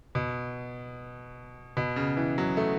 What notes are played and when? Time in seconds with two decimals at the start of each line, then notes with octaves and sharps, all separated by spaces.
0.15 B2
1.77 B2
1.96 C#3
2.17 E3
2.38 F#3
2.57 A3